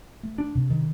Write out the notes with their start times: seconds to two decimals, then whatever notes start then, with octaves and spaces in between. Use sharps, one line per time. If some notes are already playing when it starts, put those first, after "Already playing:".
0.23 A3
0.38 D4
0.55 C3
0.70 D#3